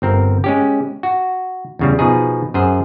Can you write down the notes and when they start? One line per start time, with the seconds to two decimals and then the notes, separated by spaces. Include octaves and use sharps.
0.02 G1 C4 A#4
0.44 G#3 C#4 G4
1.03 F#4
1.79 E2 C#3 G3
1.99 B2 F3 D#4 G#4
2.54 F#2 G#4 C5